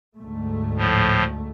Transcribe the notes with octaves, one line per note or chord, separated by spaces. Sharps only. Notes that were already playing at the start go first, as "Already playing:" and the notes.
D2 G#2 A3
A2 F3